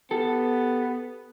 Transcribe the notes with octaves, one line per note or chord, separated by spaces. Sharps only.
B3 G4 A4